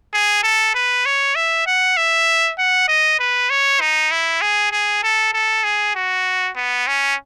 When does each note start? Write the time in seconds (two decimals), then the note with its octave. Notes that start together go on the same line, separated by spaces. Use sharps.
0.13 G#4
0.43 A4
0.74 B4
1.05 C#5
1.35 E5
1.67 F#5
1.97 E5
2.59 F#5
2.88 D#5
3.19 B4
3.50 C#5
3.81 D#4
4.11 E4
4.41 G#4
4.72 G#4
5.04 A4
5.33 A4
5.64 G#4
5.95 F#4
6.56 B3
6.87 C#4